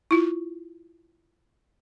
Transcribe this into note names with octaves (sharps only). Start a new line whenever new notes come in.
E4 F4